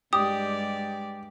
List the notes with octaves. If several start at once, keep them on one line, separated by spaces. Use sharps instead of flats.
G2 G#3 G4 D5 D#6